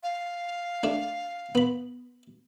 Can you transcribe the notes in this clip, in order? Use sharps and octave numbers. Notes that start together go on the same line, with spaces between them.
F5
A3 D4
B3 B5